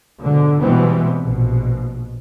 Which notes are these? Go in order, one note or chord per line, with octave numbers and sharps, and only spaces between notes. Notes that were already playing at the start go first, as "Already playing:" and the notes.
G#2 B2 D3
B2 E3 G3 G#3 B3 C4
A#1 B2